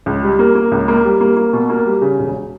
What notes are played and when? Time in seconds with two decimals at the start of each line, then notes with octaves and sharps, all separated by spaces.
0.06 C#2
0.23 G3
0.39 A#3
0.55 A#3
0.72 C#2
0.88 A#3
1.04 G3
1.21 A#3
1.37 A#3
1.53 B2
1.70 A#3
1.86 G3
2.02 C#3
2.18 E1